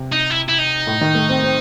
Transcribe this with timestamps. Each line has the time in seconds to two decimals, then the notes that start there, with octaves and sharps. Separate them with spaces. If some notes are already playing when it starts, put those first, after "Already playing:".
Already playing: C3
0.12 D#4
0.30 E4
0.49 E4
0.58 D#4
0.87 A2
1.01 D#3
1.15 A3
1.29 C4
1.44 C4